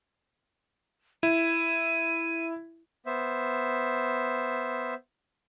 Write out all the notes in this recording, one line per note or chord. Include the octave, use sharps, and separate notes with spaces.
E4 D#7
B3 C5 E5